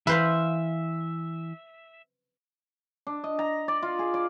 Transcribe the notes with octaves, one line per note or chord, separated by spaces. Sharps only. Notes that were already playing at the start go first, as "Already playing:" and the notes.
E3 B4 C5 E5 F5
D4
D#5
A#5
D5
F4
G#4
D5